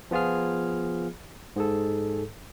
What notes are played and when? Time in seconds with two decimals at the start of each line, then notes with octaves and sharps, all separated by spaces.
0.11 F3 B3 F4 G#4 F6
1.56 G#2 G#4 A4